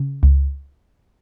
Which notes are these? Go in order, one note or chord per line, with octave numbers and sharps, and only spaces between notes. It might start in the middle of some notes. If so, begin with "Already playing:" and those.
Already playing: C#3
C#2